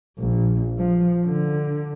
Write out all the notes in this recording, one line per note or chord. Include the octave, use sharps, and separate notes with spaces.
A#1
F3
D3